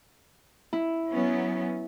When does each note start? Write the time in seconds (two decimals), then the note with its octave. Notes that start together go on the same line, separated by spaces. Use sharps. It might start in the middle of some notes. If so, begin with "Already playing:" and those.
0.73 E4
1.09 F#3 B3 C#4